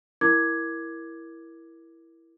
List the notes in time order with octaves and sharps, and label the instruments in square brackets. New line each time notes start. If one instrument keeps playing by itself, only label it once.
[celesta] E4 A#4 D6 G#6